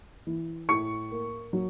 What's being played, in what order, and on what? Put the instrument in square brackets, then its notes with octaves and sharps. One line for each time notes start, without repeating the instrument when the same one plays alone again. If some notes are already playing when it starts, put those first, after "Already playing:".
[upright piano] E3
A2 C#6 C#7
A#3
F#3